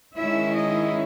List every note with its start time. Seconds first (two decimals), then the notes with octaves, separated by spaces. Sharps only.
0.16 D#3 G#3 C#4 E4 E5
0.55 D#5